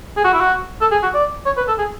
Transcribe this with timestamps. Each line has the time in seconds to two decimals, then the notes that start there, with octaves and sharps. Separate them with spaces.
0.17 G#4
0.24 F#4
0.33 E4
0.40 F#4
0.81 A4
0.91 G#4
1.03 F#4
1.14 D5
1.46 C#5
1.57 B4
1.68 A4
1.79 G#4